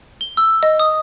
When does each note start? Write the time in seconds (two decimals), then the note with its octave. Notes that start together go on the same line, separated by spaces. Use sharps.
0.21 G7
0.37 E6
0.63 D#5
0.80 D#6